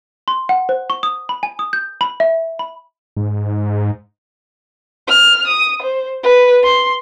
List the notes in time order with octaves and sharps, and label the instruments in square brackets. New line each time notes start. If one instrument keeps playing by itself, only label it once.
[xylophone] C6
F#5
C5
C#6
D#6
B5
G#5
D#6
G6
B5
E5
B5
[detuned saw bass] G#2
[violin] F6
D#6
C5
B4
C6